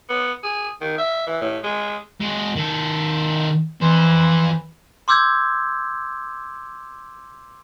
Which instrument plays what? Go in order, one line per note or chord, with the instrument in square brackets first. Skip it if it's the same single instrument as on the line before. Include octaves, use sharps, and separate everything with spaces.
[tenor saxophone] B3
G#4
D#3
E5
E3
A2
G#3
[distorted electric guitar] G#3 F#4
D#3 A4
[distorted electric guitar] F2 C5 [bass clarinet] E3
[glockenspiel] C6 D6 E6 G6 G#6